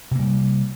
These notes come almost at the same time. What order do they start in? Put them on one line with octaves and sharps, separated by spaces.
C3 A#3 G3